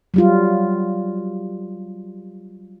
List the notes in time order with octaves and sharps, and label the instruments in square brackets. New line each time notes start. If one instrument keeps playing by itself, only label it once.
[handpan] F#3 G3 F4